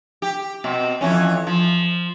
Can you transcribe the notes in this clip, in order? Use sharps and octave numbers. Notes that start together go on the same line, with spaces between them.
G4
B2 C4
F2 E3 C#4
F3